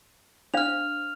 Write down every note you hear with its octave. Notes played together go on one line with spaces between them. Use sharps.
D4 C5 F5 F6 F7